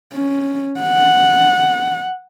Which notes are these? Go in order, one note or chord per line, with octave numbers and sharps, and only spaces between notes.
C#4
F#5